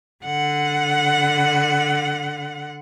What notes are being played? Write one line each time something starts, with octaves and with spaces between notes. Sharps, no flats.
D3 F#5